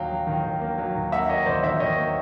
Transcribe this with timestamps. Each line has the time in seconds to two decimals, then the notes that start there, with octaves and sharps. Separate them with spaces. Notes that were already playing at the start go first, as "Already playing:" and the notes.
Already playing: D#2 F#3 F5 G5
0.10 F#3
0.27 D#3
0.44 D#3
0.61 A#3
0.78 F#3
0.95 D#2
1.12 A#3 E5 F#5
1.29 A#3 C#5 D#5
1.46 D#3 C5 D5
1.63 D#3 D5 E5
1.80 D#3 C#5 D#5
1.98 A#3